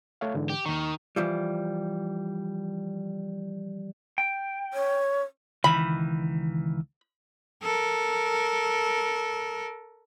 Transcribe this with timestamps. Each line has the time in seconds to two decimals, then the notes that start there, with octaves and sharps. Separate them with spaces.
0.21 A3 C#5 F5
0.34 G#2 D3 E3
0.49 G4
0.66 D#2 D#3 C#6
1.16 E3 F3 G3
4.18 G5
4.74 C#5
5.64 C#2 D#3 E3 B5
7.63 A4 A#4